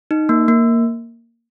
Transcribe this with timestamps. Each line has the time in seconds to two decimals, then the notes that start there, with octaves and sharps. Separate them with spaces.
0.11 D#4
0.29 A#3
0.48 A#3